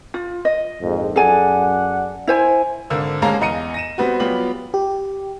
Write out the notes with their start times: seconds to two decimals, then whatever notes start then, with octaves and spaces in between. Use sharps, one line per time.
0.14 F4
0.45 D#5
0.81 A#1 F2 G#2
1.16 F#2 G#4 A4 D5 F#5 G#5
2.27 E4 C5 G#5
2.90 G#1 D3 A#4 E6
3.22 D#2 G#3 A#3 C#4 A5 A#5
3.41 E2 D#5 A#5 C#7 D#7
3.74 A#6 D#7 E7
3.98 G3 B3 C4 F#4
4.20 F#3 G3 B3 F4 G4 F#7
4.74 G4